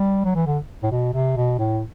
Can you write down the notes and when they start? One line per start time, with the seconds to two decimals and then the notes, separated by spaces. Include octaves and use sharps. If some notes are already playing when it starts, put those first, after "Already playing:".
Already playing: G3
0.25 F#3
0.35 E3
0.46 D3
0.83 A2
0.92 B2
1.14 C3
1.37 B2
1.58 A2